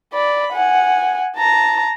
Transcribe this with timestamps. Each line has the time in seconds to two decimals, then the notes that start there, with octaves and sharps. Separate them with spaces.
0.14 D5 B5
0.53 F#5 G#5
1.37 A5 A#5